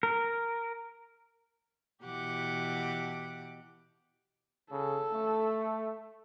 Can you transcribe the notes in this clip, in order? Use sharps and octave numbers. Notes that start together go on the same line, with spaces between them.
A#4
B2 E3 G4 F#5 D6
C#3 A4
A3